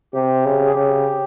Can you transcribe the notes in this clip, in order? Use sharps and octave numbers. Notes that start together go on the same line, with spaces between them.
C3 G4
C#3
G#4
C#3 G4